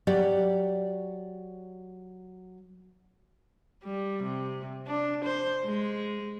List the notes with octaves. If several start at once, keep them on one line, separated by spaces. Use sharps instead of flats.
F#3 G4 D5 F#5
G3
C3
D4
C5
G#3